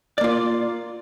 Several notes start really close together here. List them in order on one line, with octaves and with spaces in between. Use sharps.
D5 A#3 F4